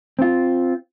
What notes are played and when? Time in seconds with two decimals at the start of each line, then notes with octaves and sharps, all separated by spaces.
0.19 C4 F4